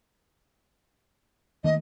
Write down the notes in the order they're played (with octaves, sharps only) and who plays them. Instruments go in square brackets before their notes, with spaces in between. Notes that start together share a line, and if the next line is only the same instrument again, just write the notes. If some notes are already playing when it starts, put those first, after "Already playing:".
[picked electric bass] D#3 A3 A#3 [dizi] D#5